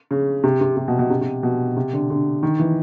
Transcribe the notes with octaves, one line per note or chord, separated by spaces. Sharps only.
C#3
C3
C3
C3
B2
B2
C3
C3
B2
C3
D3
D3
D#3
E3